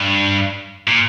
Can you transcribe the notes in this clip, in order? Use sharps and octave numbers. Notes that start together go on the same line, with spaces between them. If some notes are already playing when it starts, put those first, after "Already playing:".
Already playing: G2
A#2